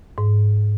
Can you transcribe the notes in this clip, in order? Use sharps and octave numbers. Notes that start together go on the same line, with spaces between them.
G#2